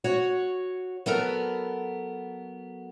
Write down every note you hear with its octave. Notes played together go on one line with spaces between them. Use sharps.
F#4 C#5 F#5
F#3 B3 A4 A#4 A#5